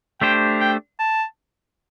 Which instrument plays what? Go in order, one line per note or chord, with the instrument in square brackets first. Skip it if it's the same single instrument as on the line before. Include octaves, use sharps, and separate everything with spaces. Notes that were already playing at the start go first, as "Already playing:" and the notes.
[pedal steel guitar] A3 D4 G4 C5 [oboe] G5
[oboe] G5
A5